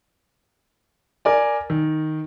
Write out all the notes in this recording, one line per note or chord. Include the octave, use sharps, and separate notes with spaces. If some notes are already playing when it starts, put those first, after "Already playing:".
A#4 D5 G#5
D#3